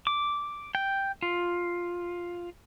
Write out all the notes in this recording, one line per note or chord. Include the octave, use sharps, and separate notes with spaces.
D6
G5
F4